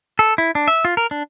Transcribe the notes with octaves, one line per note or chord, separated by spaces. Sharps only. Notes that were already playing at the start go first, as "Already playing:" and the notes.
A4
E4
D4
E5
F4
A#4
D4